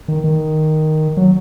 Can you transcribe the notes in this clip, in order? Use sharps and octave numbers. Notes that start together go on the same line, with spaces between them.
D#3
D#3
F#3